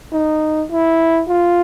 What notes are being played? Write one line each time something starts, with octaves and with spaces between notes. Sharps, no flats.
D#4
E4
F4